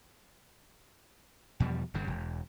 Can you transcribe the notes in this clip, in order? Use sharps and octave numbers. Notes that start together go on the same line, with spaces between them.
E2 B2 F3 G3
G1 G2 C#3
E1